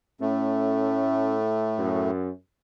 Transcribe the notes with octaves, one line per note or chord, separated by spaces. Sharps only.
A2 A3 C#4
F#2